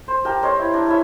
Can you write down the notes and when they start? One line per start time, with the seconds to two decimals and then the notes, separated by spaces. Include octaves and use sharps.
0.08 C5
0.25 G4 A#4 G5 A5
0.42 A#4 C5 C#5 D#5
0.59 E4
0.74 D4
0.86 E4 B4 C#5 E5